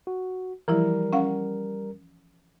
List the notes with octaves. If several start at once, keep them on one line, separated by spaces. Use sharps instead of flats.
F#4
E3 F3 G3 E4 A#4
C#4 F5 F#5